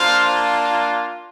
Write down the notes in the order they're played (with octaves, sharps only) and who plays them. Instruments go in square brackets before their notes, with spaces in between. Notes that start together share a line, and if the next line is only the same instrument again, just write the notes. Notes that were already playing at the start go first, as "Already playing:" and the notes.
Already playing: [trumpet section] A#3 D4 F4 C5 F5